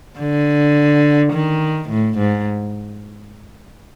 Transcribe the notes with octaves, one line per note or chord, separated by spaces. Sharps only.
D3
D#3
A2
G#2